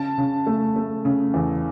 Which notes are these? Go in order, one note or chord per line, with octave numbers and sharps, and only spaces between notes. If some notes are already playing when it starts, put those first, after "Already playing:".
Already playing: C#3 A5
C#3
A3
A3
C#3
E2